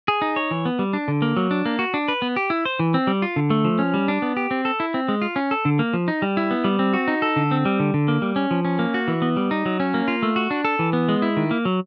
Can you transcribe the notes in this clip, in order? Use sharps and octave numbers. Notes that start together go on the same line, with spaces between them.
G#4
D#4
C#5
E3
B3
G3
D4
D3
A#3
F#3
D4
A#3
F#4
D4
B4
B3
G4
E4
C5
E3
C4
G3
F4
D3
A3
F3
C#4
G3
D4
B3
G4
C4
A4
E4
C4
G#3
F4
C#4
A4
D3
A#3
F3
D#4
G3
E4
B3
G3
C4
F#4
D#4
A4
D3
C4
G3
D3
D3
A#3
G3
C#4
F3
C#4
A#3
F#4
E3
B3
G3
D#4
F#3
C#4
A#3
F4
A3
F#4
D4
A4
E3
B3
G#3
E4
D#3
A#3
F#3